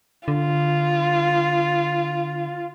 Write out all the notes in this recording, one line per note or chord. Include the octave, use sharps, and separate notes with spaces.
D3 F4